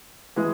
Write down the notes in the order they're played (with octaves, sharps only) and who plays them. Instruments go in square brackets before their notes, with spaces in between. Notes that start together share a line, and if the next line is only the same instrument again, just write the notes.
[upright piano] E3 G#3